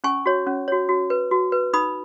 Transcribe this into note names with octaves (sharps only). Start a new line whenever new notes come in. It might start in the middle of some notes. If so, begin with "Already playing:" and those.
C#4 G#5 C#6
F#4 C#5
C#4
F#4 C#5
F#4
B4
F#4
B4
D#4 B5 D#6